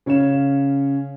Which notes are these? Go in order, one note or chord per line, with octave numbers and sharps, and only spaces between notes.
C#3 C#4 C#5 F5 E7